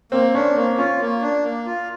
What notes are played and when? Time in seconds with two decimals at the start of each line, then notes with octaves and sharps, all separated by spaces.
0.12 A#3 C4
0.34 C#4 D4
0.56 A#3 C4
0.78 C#4 F4
1.01 A#3
1.22 D4
1.44 A#3
1.66 F4